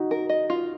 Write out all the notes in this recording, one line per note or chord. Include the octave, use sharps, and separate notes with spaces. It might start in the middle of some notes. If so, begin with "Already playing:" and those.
Already playing: D#4 F#4
A#4
D#5
F4